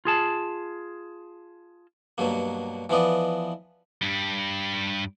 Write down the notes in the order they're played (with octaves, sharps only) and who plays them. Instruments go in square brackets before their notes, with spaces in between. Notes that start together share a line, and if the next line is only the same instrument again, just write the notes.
[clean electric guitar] F4 G#4 A5
[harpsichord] G2 B2 F#3 A#3
E3 F3 B3 D5 D#5
[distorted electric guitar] G2 G3